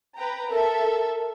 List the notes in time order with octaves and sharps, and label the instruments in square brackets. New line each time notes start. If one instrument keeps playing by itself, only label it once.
[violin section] B4 G5 A#5
[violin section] A4 E5 [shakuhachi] A#4